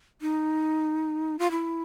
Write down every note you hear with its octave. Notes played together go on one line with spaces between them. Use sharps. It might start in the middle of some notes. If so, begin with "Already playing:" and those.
D#4
F4
E4